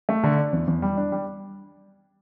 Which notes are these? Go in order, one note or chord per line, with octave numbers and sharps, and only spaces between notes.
A3
D3
D4
E2
E2
G3
D4
G3